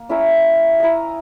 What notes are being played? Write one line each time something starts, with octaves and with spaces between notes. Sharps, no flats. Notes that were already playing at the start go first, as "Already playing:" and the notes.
Already playing: A#3
C#4 E4 A#4 E5
E4 A#4 D#5